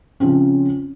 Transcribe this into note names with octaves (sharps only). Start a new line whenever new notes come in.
C#3 F3 C4 C#4